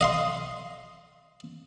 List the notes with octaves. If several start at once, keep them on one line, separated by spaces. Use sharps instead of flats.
D#5 F5 C6